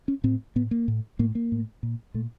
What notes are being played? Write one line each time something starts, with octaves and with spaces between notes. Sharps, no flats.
C#4
A2 C4
A2 B3
A#3
A2
A2 A#3
A#3
A2
A#2
A#2 A3